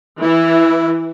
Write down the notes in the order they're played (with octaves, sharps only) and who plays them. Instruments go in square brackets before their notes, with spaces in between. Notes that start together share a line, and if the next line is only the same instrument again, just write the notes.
[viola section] E3 [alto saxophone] E4